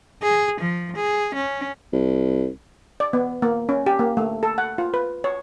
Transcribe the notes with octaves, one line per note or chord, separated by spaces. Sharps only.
G#4
F3
G#4
C#4
C2
D5
B3
A#3
C#4
G4
A#3
A3
A4
F#5
F4
B4
C#5